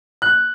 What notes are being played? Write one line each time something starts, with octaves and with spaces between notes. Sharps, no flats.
F#6